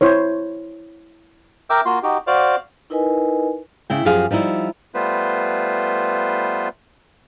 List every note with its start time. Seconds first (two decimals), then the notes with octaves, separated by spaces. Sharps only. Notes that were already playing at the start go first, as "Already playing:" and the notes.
0.01 E4 C5 C#5
1.70 A#4 E5 G5 D6 E6
1.86 A#3 F4 F#4 C6
2.03 D#4 F#4 G4
2.27 F#4 C5 D5 F5 D6
2.90 D#4 E4 A#4 B4 D#5 G#5
3.90 C#3 E4 G5
4.05 F#2 F3 G4 G#4 F5
4.31 F3 G3 D#4 E4
4.94 G3 A3 B3 F4 B4 C5